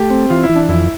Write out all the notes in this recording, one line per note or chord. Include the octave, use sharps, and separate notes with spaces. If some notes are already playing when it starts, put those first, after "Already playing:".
Already playing: A3 G4
C4
E3 F4
E4
E3
D4
F2 E4